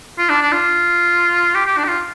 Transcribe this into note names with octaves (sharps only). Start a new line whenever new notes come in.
F4
D4
D4
F4
G4
G4
D4
G4
F4